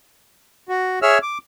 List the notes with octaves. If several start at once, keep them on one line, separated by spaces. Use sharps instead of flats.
F#4
G#4 C#5 E5 E6 F6
D6